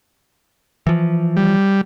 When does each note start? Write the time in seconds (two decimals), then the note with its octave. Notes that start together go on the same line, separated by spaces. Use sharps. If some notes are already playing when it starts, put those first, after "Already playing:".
0.87 E3 F3
1.36 G3